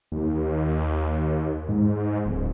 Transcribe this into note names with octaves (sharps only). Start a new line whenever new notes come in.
D#2
G#2
D1